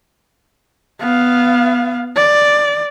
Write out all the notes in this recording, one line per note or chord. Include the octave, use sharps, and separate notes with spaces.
B3 F5
D5